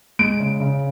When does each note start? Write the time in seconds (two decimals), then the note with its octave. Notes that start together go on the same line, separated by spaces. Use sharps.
0.19 G#3 D7
0.40 C#3
0.60 C#3